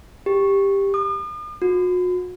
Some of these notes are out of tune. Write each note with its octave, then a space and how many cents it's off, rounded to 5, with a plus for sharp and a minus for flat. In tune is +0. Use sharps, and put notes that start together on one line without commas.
G4 +10
D#6 -45
F#4 -40